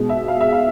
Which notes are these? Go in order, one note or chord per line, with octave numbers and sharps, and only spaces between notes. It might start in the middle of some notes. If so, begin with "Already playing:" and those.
Already playing: B2 G#3
E5
F5
E5
F5